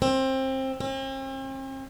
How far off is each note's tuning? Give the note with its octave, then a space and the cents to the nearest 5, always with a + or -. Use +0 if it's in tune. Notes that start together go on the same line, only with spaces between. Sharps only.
C4 +20
C4 +45